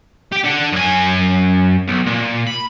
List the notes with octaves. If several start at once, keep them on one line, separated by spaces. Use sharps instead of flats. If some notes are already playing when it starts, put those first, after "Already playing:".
G4 G5
D3 F#5
F#2 G#5
B1
A#2
B5